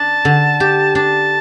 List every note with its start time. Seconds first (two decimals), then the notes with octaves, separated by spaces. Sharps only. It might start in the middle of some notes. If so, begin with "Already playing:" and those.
Already playing: D4 A5
0.25 D3
0.60 G4
0.95 D4 A5